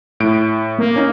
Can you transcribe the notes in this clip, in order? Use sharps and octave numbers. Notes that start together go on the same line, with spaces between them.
A2 D7
A#3
C#4 D#4